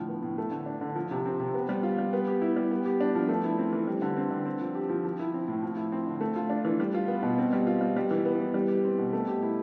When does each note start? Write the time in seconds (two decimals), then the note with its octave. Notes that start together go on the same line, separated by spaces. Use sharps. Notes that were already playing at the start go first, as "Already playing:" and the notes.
Already playing: A2 D3 F3
0.08 B3
0.23 A2
0.38 A3
0.51 D3
0.66 D4
0.81 D3
0.95 F3
1.11 C3
1.26 C4
1.40 C3
1.54 B3
1.69 G3
1.83 F4
1.98 G3
2.13 B3
2.27 G4
2.42 E4
2.56 G3
2.71 B3
2.85 G4
3.01 D4
3.15 F3
3.29 A3
3.44 E4
3.58 C4
3.73 E3
3.87 G3
4.02 D3
4.17 C4
4.31 D3
4.45 C4
4.61 F3
4.75 G4
4.89 F3
5.05 F3
5.20 E4
5.34 C4
5.48 A2
5.63 F3
5.77 E4
5.92 C4
6.07 D3
6.21 A3
6.36 F4
6.50 D4
6.65 E3
6.80 G3
6.94 F4
7.08 B3
7.23 B2
7.38 C4
7.53 G3
7.67 F4
7.81 G3
7.97 G3
8.11 E3
8.25 B3
8.39 E3
8.54 G3
8.68 G4
8.84 C4
8.99 B2
9.13 A3
9.28 G4
9.43 E4